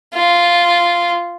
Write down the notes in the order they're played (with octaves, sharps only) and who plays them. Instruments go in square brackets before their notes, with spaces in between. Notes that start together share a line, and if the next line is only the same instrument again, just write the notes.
[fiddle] F4